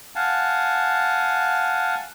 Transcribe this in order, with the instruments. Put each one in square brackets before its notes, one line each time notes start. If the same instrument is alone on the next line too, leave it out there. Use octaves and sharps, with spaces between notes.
[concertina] F5 F#5 G#5 A5